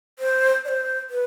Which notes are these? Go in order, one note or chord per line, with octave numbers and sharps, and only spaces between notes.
C5
D5
C5
B4